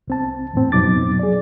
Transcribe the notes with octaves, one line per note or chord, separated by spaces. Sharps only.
C2 C4 A5
E2 A2 C4
F2 B2 F#3 D#4 D6 A6
G#4 D5